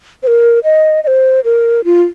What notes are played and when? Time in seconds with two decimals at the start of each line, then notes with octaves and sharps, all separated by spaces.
0.23 C5
0.27 A#4
0.64 D#5
1.04 D#5
1.07 C5
1.44 A#4
1.85 F4